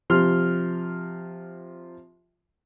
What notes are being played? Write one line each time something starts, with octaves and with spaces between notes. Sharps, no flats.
C3 F3 C6 F6